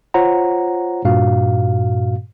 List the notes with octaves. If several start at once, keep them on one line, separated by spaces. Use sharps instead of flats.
F4 C5 C#5 F#5 A#5
G2 A#2 F#4 F5